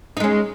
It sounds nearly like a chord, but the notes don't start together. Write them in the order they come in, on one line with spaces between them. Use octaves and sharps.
D#4 G#3 C#4